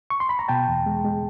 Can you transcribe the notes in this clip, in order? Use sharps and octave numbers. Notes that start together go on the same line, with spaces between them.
C#6
C6
B5
A#5
B2 G5 A5
E2
G#3
G#3